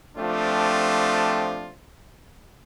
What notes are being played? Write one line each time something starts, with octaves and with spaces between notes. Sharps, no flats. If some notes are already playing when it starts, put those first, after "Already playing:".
F3 A3 C4 D4 F4 G4